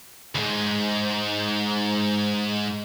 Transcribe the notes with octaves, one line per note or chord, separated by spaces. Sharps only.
D2 G#2